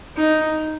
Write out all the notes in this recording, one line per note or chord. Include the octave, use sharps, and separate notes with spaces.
D#4